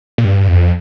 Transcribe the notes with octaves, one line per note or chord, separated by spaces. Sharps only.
A#2
G2
F2